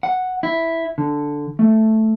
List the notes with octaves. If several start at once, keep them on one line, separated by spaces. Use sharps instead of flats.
F#5
E4
D3
A3